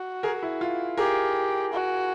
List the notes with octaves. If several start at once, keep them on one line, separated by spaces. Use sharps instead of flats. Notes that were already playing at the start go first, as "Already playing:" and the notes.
Already playing: F#4
G#4 A#4
E4
F4
G4 G#4 A#4
F#4